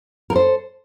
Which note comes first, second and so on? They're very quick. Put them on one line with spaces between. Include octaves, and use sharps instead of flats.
A#4 A4 C5